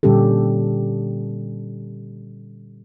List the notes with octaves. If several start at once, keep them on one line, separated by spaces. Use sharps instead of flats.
A#2 D3 G3 C#4 G4 A4